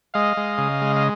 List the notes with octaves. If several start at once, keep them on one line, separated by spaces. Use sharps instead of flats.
G#3 D#5 F5
G#3
C#3
G#3
F5